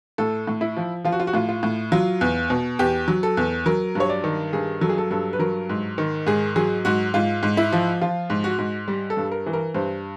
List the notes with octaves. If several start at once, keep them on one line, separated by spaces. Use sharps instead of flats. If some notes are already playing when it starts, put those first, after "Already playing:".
A2 A4
A2
E4
F3
F3 F4
F#4
F4
F#4
A2 F4
F4
A2
F#3 F4
E2
B2
E2 G4
F#3
A4
E2
F#3 A#4
G2 C#5
D5
D#3
G2 G#4
F#3 A4
G#4
A4
G2 A4
B4
F#3 A#4
G#2
D#3
G#2 G#4
F#3 G#4
G#2 F#4
G#2 F4
G#2
E4
F3
F3 F4
G#2
F#4
G#2
G3
A4
G2
A#4
E3
A#4
G2 C5